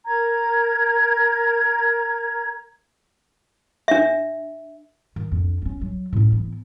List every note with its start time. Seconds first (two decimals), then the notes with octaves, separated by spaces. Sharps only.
0.06 A#4 A#5 G#6
3.88 D4 E5
5.16 D#3
5.32 F2 D4
5.62 C#4 D4
5.81 F#3
6.13 A2 C#4
6.32 E3 B3